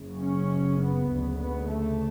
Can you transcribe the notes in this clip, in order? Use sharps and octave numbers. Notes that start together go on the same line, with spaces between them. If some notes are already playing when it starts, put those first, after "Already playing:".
Already playing: F#1 F#2 C#3
C#4
B3
D2 C#3
B3
A3